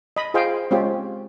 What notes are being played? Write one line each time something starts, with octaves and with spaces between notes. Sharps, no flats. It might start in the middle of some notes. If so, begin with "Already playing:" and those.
D#5 B5
F4 G#4 C5 D#5 F5 G5
G#3 C4 C#4 F4 G4